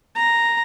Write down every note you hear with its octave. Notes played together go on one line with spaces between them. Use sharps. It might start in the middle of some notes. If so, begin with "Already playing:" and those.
A#5